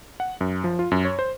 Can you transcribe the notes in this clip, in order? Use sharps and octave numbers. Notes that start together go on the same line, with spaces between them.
F#5
F#2
F3
F4
F#2
C#5
C5